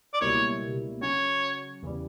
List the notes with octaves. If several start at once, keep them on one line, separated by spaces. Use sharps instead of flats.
D5
C#2 B2 G3 A#3 E4 C#5
C#3 F#3 C#4 F#4 C#5
E2 C#3 E3 G3